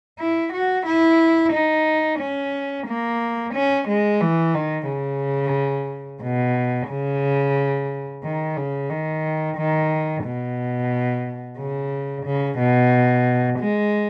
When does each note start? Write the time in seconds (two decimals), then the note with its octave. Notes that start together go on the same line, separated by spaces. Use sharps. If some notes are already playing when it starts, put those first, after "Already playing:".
0.19 E4
0.53 F#4
0.86 E4
1.52 D#4
2.19 C#4
2.87 A#3
3.53 C#4
3.88 G#3
4.21 E3
4.54 D#3
4.88 C#3
6.22 B2
6.89 C#3
8.23 D#3
8.57 C#3
8.90 D#3
9.57 D#3
10.25 B2
11.58 C#3
12.25 C#3
12.58 B2
13.59 G#3